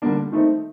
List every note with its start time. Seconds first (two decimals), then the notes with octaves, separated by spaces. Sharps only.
0.02 D3 G3 A#3 D4
0.32 D#3 A3 C4 D#4